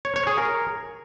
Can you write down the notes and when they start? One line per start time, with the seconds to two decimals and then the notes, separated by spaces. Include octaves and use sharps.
0.05 C#5
0.16 C#5
0.27 G#4
0.38 A#4